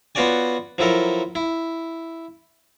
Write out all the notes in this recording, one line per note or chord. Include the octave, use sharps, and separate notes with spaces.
B3 F4 F#4 C#5 D5 G#5
F3 F#3 E4 A4 A#4
E4